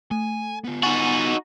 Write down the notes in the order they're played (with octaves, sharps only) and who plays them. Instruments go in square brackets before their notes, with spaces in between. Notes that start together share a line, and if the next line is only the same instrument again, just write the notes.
[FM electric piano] A3 [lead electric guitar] G#5
[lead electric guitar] B3 F4
[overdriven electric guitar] D#4 F#4 [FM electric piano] F#5 G#5 A6